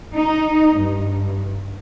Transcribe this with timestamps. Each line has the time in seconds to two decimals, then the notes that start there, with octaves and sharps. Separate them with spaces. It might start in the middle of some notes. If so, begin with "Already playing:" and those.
0.14 D#4
0.78 G2